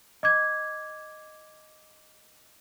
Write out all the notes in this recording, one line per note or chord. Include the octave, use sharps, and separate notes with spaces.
D#5 D6 G#6